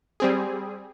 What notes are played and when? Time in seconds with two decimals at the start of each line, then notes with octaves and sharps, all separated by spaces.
0.20 G3 C4 G#4